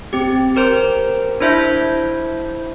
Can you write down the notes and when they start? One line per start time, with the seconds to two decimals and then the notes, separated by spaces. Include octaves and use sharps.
0.13 C4 G4
0.56 G4 A#4 C5
1.40 D4 E4 C5 E5 G6